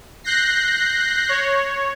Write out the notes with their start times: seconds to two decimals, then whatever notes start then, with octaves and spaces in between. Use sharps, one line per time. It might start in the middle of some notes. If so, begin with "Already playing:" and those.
0.24 F#6 G6 A#6 C7
1.29 C#5